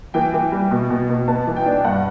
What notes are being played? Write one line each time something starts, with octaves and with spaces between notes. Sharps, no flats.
E3 G5
E3
G3
B2
B2
B2
B3 A5
E3
G5
D4
G2 F#5